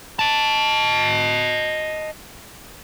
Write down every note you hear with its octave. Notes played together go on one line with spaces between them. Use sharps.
D#5 A5